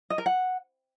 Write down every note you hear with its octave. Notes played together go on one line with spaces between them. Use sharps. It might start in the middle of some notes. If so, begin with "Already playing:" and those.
D#5
A#4
F#5